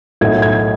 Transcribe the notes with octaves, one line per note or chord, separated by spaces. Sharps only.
B1 A2 F#3 G#6
G#6